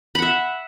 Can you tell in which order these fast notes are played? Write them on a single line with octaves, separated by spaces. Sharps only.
B5 F#5 E5